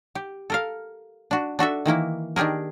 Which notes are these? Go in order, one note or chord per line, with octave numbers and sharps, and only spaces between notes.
G4
A4 A#4 F5
D4 F#4
D4 F#4 A4 E5
D#3 E3 A#3 E4
D#3 D4 G4 G#4 A#4